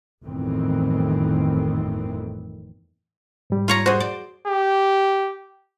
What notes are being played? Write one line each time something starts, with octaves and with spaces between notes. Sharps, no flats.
G1 F2 A2 D#3 E3 C4
G#2 G3
F4 C#5 A#5
F#4 G#4 C5
D5
G4